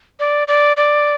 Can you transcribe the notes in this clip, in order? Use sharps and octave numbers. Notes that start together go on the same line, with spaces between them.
D5
D5
D5